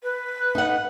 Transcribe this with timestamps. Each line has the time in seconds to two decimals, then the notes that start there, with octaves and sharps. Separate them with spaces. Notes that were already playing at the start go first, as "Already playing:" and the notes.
0.03 B4
0.55 D#4 F#5